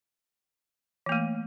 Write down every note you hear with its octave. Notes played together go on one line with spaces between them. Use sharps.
E3 A3 A#3